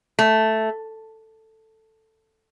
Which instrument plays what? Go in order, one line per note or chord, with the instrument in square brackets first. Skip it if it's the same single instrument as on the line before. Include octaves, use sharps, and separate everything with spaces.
[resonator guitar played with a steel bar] A3